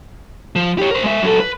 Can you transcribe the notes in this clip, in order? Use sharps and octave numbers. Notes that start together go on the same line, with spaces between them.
F3
G4 C#5
A#4 C5
G#3 E5
F#3 A4
B4